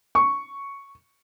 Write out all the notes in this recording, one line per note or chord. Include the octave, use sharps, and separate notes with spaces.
C#6